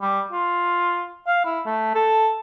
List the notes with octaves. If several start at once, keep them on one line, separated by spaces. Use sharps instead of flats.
G3
F4
F5
E4
A3
A4